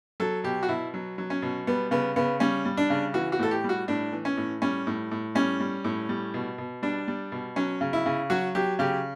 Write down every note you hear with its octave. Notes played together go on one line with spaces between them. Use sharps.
F#3 A4
B2 G4
F#4
B2 E4
F#3
F#3
C#4
B2
G3 B3
C#3 B3
C#3 B3
G3 C#4
G3
D4
C#3
E3 F#4
F#4
A2 A4
G4
G3
F#4
A2 D4
E3
C#4
A2
G3 C#4
A2
A2
G3 C#4
G3
A2
G3
B2
B2
G3 D4
G3
B2
F#3 C#4
C#3
E4
C#3
F#3 F#4
F#3 G4
C#3 G4